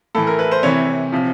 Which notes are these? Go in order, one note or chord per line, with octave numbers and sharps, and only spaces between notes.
A2 E3 A4
A#4
B4
C5
C3 E3 C#5
C3 F3